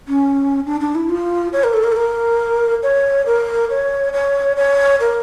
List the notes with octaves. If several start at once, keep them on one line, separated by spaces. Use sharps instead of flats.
C#4
D4
D4
E4
F4
C#5
A#4
A4
A#4
A4
A#4
C#5
A#4
C#5
C#5
C#5
A#4